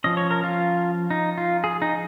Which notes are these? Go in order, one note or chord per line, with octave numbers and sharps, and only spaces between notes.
F3 C#4 D#5
C#5
A#4
F4
D#4
F4
G#4
D#4